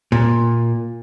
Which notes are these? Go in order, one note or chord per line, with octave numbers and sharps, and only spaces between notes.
A#2